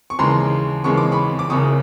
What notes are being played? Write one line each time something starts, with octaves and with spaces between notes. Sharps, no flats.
C#6
D#2 C#3 E3 G#3 A#5 C6
D#2 C#3 E3 G#3 C#6
D6
B5 C#6
D6
F#1 F#2 C#3 C#6 D#6